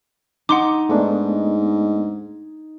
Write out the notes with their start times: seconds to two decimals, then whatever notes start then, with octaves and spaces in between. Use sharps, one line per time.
0.49 D#4 F#5 C6 D6
0.89 G#2 A3 B3 D4